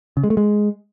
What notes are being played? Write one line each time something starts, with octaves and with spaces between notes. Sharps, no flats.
C#3
G#3
A3
G#3